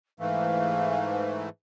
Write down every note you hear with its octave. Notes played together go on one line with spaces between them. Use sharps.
G#2 E3 A3 F5